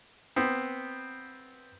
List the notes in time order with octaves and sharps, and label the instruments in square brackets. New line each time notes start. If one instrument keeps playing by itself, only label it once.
[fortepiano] B3 C4